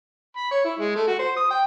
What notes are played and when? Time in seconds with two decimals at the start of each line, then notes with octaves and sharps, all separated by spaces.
0.36 B5
0.51 C#5
0.64 E4
0.79 G#3
0.95 A3
1.07 F#4
1.19 C5
1.36 D#6
1.50 G5